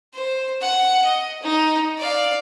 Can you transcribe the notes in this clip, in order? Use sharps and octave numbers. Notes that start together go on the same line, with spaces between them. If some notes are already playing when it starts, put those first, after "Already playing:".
C5
F#5
D#5
D#4
D5 F5